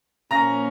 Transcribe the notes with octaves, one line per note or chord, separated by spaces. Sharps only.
A#2 F3 A#3 C#4 A#5 A#6